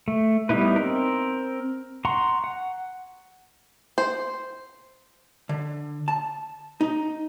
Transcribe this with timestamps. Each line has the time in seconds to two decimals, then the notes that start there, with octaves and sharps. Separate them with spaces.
0.08 A3
0.49 G3 B3 D#4 E4 B4
0.76 C4 A#4
2.05 F#5 A#5 C6 C#6
2.44 F#5
3.98 C5
5.49 D3
6.08 A5
6.81 D#4